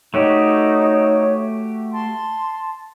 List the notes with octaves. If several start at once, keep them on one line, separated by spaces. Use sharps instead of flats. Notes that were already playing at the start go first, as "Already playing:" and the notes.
A3 D#4 F#4 G4 C#5
A5 C6